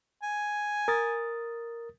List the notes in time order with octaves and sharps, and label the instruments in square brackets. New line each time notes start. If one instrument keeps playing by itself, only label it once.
[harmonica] G#5
[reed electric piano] A#4 D#6 A6